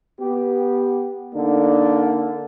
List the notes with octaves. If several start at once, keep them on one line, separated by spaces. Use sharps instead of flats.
B3 G4
D3 A#3 D4 D#4